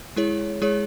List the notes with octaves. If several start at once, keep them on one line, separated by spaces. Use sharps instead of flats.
G#3 E4 G#4 C#5
G#3 E4 G#4 C#5